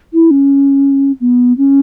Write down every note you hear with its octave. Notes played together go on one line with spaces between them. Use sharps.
E4
C#4
B3
C#4